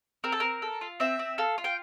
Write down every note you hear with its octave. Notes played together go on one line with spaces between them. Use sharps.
C4 A#4
A4
C4 A#4
A4
F4
C4 E5
C4
A4 F5
F4
G5